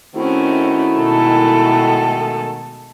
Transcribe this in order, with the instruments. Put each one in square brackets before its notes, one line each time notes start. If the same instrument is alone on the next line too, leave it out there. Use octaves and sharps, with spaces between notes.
[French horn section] D#3 A3 F#4 [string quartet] C4 C#4 [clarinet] E4
[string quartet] B2 G#3 A4